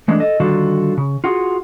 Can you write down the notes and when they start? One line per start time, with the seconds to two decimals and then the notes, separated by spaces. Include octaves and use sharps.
0.08 E3 G#3 A3 D4
0.20 A4 D#5
0.40 D3 D#3 G3 F4 F#4 A4
0.98 C#3
1.24 F4 F#4 G#4